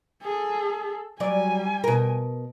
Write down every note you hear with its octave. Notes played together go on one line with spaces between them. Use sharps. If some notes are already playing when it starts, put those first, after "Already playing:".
G#4 A4
F#3 G3 D5 G#5
B2 A#4